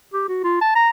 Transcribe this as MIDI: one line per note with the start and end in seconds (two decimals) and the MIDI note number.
0.14 0.26 67
0.28 0.41 66
0.44 0.60 65
0.61 0.74 81
0.76 0.90 82